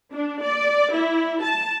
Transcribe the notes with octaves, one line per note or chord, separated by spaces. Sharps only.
D4
D5
E4
A5